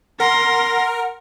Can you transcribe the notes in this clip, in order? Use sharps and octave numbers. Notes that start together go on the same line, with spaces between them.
A#4 F#5 C6 A#6